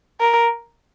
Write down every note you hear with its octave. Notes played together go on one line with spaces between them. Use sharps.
A#4